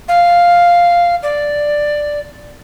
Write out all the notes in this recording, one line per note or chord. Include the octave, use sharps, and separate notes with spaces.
F5
D5